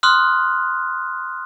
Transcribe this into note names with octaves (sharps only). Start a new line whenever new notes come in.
C6 D#6 F6 F#6